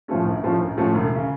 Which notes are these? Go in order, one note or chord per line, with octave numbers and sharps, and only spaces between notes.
A2 F3 A3 C#4
A#1
A2 F3 A3 C#4
A#1
A2 F3 A3 C#4
E1
C#3